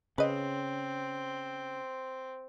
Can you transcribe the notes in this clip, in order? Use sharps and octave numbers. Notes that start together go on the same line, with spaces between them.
C#3 C4 B4 D#5